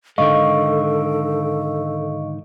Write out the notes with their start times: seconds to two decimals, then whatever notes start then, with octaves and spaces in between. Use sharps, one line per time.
0.18 G#2 D3 D#3 A4 D#5 F5 C#6